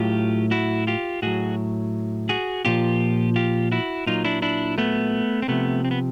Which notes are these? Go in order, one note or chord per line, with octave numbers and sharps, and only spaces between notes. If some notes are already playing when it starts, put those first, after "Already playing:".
Already playing: A2 F#3 F4 G4
E4 F#4
F4 G4
A2 F#3 F#4 G#4
F#4 G#4
A#2 F3 F4 G4
F4 G4
E4 F#4
A#2 F#3 D#4 F4
D4 E4
D4 E4
A3 B3
C4
C3 F3 A3 B3
C4
B3